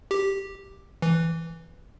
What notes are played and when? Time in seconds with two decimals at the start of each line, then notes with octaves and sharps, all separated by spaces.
0.11 G4
1.02 E3